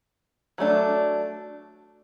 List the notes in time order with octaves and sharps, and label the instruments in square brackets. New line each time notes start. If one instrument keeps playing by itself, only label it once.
[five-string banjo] F#3 A3 D4